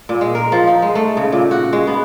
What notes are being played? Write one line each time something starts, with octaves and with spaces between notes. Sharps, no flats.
A#2
G#3
A#4
F3
D#4
G#3
A3
C#3
A#2
F#4
G#3
B3